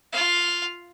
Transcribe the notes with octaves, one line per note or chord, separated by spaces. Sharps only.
F4 F5